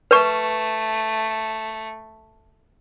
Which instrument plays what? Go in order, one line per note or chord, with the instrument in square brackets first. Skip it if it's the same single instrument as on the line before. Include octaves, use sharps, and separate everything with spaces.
[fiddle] A3 [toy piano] B4 C#6